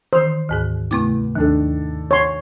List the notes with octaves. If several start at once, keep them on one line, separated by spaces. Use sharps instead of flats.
D#3 E3 C5
D2 G#2 G#4
E2 C3 A3 D6
D#2 D#3 D4 A4
C#5 C6